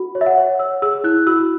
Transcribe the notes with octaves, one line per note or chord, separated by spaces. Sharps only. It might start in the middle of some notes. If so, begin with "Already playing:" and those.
Already playing: F#4
C#5
E5
F#5
C#5
C#5 E6
G#4 E6
E4 F#6
F#4 E6